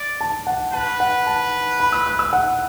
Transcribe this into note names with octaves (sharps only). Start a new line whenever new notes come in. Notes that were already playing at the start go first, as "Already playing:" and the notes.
Already playing: D5
A5
F#5
B4 A5
F#5
A5
B5
E6
F#6
E6
F#5